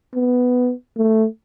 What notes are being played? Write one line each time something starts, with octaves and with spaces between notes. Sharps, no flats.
B3
A3